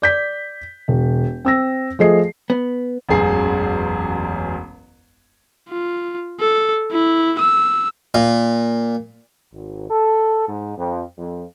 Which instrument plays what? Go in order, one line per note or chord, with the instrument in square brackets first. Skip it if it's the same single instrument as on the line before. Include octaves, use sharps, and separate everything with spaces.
[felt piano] D5 G6 B6
E1
C4 E6 A#6
F3 A3 G#4 D#5 C7
[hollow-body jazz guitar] B3
[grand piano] E1 A1 F#2 G#4 C7
[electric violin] F4
A4
E4
E6
[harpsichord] A#2
[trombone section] G#1
A4
G#2
F2
F2